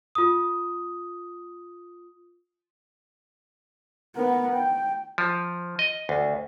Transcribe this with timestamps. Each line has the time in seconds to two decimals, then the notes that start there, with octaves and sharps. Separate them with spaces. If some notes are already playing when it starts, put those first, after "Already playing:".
0.15 F4 D#6
4.16 B3 A#4
4.53 G5
5.18 F3
5.79 D#5
6.09 D2